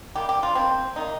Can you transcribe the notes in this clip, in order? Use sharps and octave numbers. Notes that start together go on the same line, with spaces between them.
D#3 G3 A#3 G4
G4
F4
D#3 G3 A#3 C4
C3 D#3 A#3 D#4